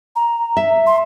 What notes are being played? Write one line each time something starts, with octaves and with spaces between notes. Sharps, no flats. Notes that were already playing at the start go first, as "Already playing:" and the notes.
A#5
E5
C6